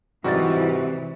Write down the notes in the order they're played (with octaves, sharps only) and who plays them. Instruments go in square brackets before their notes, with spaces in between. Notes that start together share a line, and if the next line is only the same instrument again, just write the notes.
[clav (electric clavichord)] G#2 G3 [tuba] C3 [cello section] E3 [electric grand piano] F#4 D5 A6